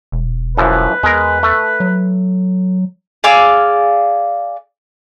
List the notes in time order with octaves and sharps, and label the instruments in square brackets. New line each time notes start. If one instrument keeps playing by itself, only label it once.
[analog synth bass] E1
[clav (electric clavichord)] F#2 E3 F3 [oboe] B4
[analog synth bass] E2 [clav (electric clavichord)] G#3 A#4
[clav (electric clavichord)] A3
[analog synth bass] F#3
[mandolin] G#4 D5 F5 E6